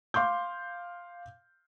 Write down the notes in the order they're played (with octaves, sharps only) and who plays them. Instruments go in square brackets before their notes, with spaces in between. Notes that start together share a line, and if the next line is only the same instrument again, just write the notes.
[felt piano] F5 C6 D6 G6